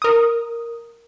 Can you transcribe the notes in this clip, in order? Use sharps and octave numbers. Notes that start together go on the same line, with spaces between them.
A#4 D#6